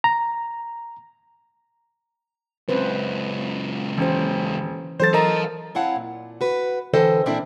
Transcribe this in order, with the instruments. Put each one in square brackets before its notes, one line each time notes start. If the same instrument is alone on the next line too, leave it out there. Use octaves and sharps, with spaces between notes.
[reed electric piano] A#5
[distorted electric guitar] C#2 F#2 [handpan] C4 B4 C5
[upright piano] D#1 [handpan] E3 C#4 C5
[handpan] E3 F#3 A4 [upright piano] C5 A6
[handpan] A#4 [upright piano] D#5 A#5 [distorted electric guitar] F5 A5
[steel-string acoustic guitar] C4 E4 C#5 F5 F#5 A5
A#2
F#4 B4
D3 E3 A4 C5 D#5 G5
A#2 C4 D4 E4 A#4 E5